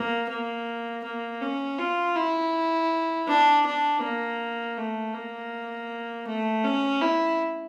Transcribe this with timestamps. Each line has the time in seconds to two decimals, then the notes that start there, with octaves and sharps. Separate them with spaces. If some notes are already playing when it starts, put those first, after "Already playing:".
Already playing: A#3
0.29 A#3
1.04 A#3
1.41 C#4
1.79 F4
2.16 E4
3.28 D4
3.66 D4
4.02 A#3
4.78 A3
5.14 A#3
6.27 A3
6.64 C#4
7.02 E4